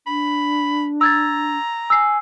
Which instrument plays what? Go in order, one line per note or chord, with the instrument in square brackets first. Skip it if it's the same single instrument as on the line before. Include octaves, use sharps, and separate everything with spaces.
[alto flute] D4 [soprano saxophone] B5
[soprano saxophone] A#5 [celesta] E6 G#6 A6
[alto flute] G#5 [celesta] E6 C7